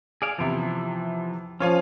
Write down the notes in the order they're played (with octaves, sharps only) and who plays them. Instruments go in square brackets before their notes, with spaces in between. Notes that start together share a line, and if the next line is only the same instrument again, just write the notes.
[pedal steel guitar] G#4 D5 F5
[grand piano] E2 C3 [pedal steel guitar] F3 E4
[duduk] F3 [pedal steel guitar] C#4 [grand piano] F4 C#5 F5